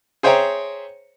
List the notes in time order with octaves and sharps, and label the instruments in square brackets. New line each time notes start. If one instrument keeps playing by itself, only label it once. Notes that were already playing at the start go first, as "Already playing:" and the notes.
[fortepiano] G#4 C5 C#5 E5 G5 A#5